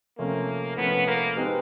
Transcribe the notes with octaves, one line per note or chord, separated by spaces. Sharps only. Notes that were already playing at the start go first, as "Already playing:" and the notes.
C3 F3 A3 A#3 C#4
C3 F3 A3 B3 C#4
A#3
G#3 C4 D#4 G4 B4